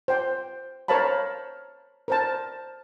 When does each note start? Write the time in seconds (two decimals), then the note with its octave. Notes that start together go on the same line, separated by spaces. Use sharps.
0.08 C5 G5
0.88 A#4 C5 C#5 F5 A5 B5
2.08 A#4 C5 A5